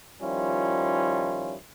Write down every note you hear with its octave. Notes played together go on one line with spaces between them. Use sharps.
D#3 F3 G3 C#4 E4 F4